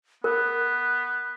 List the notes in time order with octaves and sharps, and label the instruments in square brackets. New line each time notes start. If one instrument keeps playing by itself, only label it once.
[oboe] B3 [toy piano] A#4 [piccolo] F#6